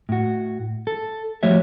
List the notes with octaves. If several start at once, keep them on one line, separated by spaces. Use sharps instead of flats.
A2 F#4
A4
F3 G3 A3 F#4 C#5 E5